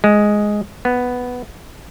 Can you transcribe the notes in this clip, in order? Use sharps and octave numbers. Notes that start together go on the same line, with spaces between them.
G#3
B3